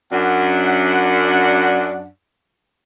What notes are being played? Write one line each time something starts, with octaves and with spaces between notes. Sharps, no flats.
F#2 D4 F#5